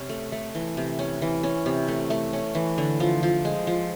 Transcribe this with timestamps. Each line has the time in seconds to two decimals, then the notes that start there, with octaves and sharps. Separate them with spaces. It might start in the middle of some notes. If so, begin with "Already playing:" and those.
Already playing: C3 C#4
0.09 A3
0.32 A3
0.55 E3
0.77 C3
0.99 C#4
1.22 E3
1.43 C#4
1.66 C3
1.88 A3
2.10 A3
2.33 C#4
2.55 E3
2.78 D3
3.00 F3
3.23 F3
3.45 G#3
3.67 F3